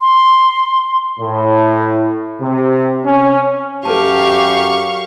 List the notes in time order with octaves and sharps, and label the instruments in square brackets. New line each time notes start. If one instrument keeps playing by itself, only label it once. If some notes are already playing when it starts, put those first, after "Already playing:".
[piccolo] C6
[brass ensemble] A2
C3
C#4
[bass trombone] F#2 [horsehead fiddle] G4 [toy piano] A4 B4 A5 [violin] F5 C#6